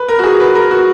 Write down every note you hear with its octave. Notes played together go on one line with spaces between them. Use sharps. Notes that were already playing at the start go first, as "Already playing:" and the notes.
Already playing: B4
A#4
F#4
G#4
B4
A#4
F#4